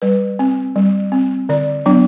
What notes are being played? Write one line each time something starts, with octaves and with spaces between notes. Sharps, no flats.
G3 B4
C4
G3
C4
D3 D5
F#3 B3 D4